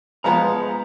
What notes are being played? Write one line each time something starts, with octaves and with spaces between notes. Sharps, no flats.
F3 G#3 B3 A#5